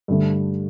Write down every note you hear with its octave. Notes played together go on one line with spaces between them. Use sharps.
G2 D3 A3